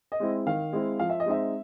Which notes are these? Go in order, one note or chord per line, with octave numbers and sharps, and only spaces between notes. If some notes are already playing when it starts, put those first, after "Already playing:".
D#5
G#3 C4 E4
D#3 F5
G#3 C4 E4
F3 F5
E5
D#5
G#3 C4 D#4 E5